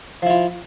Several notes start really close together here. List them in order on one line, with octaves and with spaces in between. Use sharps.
F3 E4 F4